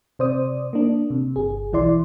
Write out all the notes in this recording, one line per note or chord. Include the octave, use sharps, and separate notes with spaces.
C3 C5 D5 D#6
A#3 D4
C3
G1 G#4
B1 E3 E4 D5 C6